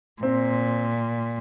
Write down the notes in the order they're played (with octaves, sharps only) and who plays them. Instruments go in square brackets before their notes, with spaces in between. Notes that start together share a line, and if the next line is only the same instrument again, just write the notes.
[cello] A#2 [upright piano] C4